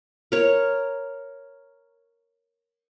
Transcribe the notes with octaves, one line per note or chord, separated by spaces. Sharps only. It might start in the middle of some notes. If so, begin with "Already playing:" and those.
A#4 C#5